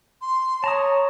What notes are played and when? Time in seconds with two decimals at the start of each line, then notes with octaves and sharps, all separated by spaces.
0.22 C6
0.64 C#5 A5 A#5 D#6